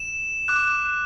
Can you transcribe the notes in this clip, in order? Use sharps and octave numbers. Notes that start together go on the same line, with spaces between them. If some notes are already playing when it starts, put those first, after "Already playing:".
Already playing: E7
D6 F#6